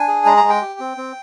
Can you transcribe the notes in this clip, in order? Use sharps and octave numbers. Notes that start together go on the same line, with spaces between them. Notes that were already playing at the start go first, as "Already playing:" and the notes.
Already playing: D4 G#5
G#4
G#3 A#5
A#5
G#3
G5
G4
C4
C4